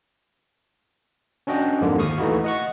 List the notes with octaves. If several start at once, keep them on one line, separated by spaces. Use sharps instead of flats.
C#4 D4 F#4 D#5 G5
F2 G#2 D3 A#3 F4
D#2 F5 C#6 D#6
E3 A3 D#4 E4 F#4
D#5 F#5 C#6